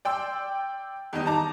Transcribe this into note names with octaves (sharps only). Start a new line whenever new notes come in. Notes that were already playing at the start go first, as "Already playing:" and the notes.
D5 G5 C6 E6
E2 D#3 G3 D#4
A5 A#5 D6